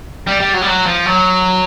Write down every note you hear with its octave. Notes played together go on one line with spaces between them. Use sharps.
G3
G3
F#3
G3
F#3
F3
F#3